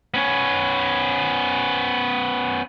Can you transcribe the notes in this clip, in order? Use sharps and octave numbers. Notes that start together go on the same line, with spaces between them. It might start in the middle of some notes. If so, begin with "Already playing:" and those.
B3 C#4